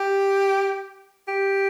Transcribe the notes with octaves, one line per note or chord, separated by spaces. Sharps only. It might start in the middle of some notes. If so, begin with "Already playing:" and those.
Already playing: G4
G4